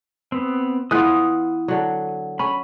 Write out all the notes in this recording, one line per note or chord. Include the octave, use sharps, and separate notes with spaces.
B3 C4
E3 B3 F4 D#6 F#6
D3 F#3
C#4 B5